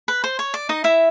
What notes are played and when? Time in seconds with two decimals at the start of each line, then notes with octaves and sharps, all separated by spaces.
0.08 B4
0.24 C5
0.39 C#5
0.54 D5
0.69 D#4 D#5
0.84 E4 E5